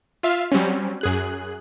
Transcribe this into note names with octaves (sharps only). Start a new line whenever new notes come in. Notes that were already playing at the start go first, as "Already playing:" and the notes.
F4 E5 F5
F#3 G3 C4 C#4
F#2 G#4 F#6